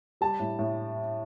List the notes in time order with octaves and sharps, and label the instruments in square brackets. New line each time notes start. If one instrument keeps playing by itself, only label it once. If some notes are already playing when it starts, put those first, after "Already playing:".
[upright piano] G3 A5
A2
A2